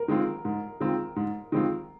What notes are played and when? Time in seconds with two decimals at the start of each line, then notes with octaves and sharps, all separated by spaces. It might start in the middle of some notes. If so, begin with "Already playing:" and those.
Already playing: A#4
0.08 D#3 G#3 C4 F4
0.45 G#2
0.80 D#3 G#3 C4 F4
1.16 G#2
1.52 D#3 G#3 C4 F4